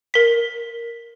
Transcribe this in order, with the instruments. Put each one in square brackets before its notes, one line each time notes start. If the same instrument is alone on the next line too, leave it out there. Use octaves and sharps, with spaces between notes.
[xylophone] A#4 B6